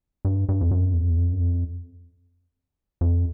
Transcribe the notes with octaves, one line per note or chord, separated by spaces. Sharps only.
G2
G2
F2
F#2
E2
F2
E2
F2
F#2
F2
F2